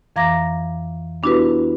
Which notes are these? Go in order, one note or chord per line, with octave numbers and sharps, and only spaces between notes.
F2 E3 F5 A#5 D6 A#6
B3 D4 E4 F#4 G4 B4